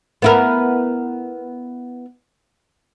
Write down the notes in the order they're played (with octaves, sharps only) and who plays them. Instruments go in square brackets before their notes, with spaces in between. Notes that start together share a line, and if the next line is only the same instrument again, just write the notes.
[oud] B3 E4 A#4